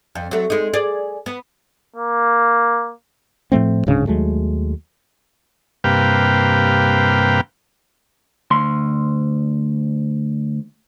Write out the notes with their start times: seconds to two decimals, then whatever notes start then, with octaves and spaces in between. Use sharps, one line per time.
0.15 F2
0.31 F#3 A3
0.50 G#3 D#4
0.74 G#4 D5
1.26 B3
1.96 A#3
3.52 A2 F3 A3 C4
3.87 D1 G#2 C#3 D4
4.07 D#2 F#3 G#3 A3
5.84 G2 C3 A#3 B4 F5 G5
8.51 D2 C6